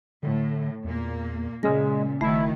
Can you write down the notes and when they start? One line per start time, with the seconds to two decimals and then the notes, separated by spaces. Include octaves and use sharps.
0.23 A2 D3
0.85 E2 A#2 A#3
1.63 A#2 C#3 G#3 C#4 A#6
2.21 G1 D#3 F#3 A3 E4